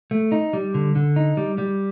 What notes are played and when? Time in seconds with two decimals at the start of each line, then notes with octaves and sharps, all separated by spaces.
0.11 A3
0.32 D#4
0.53 G3
0.74 D3
0.95 D3
1.16 D#4
1.37 G3
1.58 G3